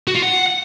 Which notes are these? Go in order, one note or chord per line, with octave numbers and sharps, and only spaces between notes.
F#4
F4
F#5